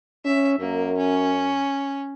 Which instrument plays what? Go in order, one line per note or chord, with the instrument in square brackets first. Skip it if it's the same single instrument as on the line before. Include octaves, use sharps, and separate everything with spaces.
[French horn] C#4 [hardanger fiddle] E5
[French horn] F#2 [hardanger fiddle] A#3
[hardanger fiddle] C#4